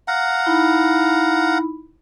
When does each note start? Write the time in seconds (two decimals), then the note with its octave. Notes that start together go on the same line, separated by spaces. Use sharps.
0.08 F5 F#5 A#5
0.46 D#4 E4 B5